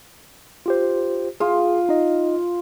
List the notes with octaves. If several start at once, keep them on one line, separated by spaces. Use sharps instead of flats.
F4 G4 C5
F4 G#4
D#4 D#5